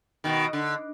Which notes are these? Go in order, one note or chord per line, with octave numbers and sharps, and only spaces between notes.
B2 D#3
D3